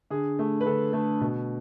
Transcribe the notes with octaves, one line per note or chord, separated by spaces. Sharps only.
D3 G#4
A3
B4
D3 A4
A3
B2